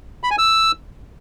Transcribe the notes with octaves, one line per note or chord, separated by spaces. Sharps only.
B5
G#5
E6